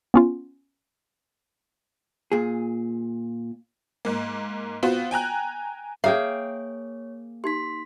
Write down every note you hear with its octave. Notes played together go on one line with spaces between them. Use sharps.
B3 C#4 F4
A#2 G#4
G#2 A#3
B3 C4 F4 F#4 C5
G5 G#5 A#5 F#6
A#3 G#4 C#5 E5 F5 G5
D#4 G4 C6 B6